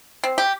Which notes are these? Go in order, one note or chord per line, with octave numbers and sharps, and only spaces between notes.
C4
G4